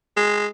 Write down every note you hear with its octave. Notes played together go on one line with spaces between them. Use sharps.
G#3